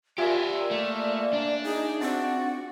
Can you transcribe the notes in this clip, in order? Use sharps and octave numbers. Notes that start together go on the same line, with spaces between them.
F4 G4 A#4 D5 E5 G#5
A3 A#3
D4
D#4 G#4
C4 F#4 D5